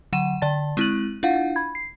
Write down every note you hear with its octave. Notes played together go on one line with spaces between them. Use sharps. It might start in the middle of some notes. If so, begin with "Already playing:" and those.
D3 F#3 F#5 D#7 E7
D3 D5 A5 A6
G#3 C4 E4 F#6 D#7 F#7
D4 E4 F4 F5 F#5
B5 G#6
C7